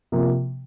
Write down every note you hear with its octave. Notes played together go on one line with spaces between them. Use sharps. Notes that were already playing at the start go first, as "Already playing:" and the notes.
C3 F3 A#3